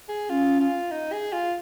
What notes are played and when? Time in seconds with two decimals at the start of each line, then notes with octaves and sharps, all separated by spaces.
0.09 G#4
0.30 C#4 F4
0.60 F4
0.91 D#4
1.13 G#4
1.33 F4